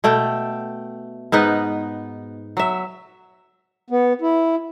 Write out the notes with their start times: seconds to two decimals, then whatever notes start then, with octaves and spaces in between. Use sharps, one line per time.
0.04 B2 A3 G5
1.32 G#2 B3 D#4 B4
2.57 F#3 E5
3.90 B3
4.21 E4